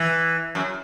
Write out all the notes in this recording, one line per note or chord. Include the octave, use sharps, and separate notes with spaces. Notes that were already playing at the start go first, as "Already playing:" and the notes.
Already playing: E3
F#2